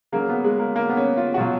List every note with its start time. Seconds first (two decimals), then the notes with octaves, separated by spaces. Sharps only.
0.12 C#3 F#3 A#3
0.29 B3
0.44 G#3
0.59 A#3
0.76 A#3
0.89 B3
0.97 C#4
1.17 F4
1.34 F#4
1.38 B2 F#3 F4